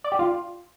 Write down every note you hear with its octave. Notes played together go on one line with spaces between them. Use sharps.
D5
G4
F4